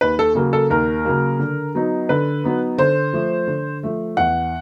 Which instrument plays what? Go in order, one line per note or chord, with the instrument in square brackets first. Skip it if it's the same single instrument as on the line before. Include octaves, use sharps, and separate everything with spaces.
[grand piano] D#2 B4
A4
C#3 F#3 A#3
A4
D#2 A#4
C#3 F#3 A#3
D3
F#3 B3 D#4
D3 B4
F#3 B3 D#4
D3 C5
F3 A3
D3
F3 A3
E2 F#5